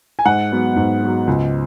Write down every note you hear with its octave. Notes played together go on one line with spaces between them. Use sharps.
G#5
G#2 F#5
F#3 B3
G#2
F#3 B3
C#2